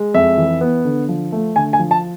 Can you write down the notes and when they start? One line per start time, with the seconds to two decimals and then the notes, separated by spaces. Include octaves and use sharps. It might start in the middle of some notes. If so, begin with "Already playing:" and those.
Already playing: G#3
0.14 F2 E5
0.38 E3
0.61 B3
0.85 D3
1.09 F3
1.32 A3
1.56 D3 G#5
1.73 G#5
1.79 F3
1.91 A5